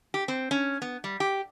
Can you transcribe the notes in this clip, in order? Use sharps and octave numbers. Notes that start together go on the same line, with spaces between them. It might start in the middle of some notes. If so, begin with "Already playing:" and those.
G4
C4
C#4
B3
G3
G4